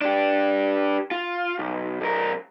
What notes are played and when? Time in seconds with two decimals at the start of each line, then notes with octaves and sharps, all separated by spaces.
0.01 D4 G4
1.11 F4
1.59 B1
2.01 B1 A#4